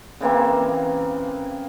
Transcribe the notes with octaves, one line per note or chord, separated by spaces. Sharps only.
C#3 E3 A#3 C4